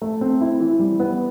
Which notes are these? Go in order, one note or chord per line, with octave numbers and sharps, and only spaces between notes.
A3
C4
E4
E3
G3
B3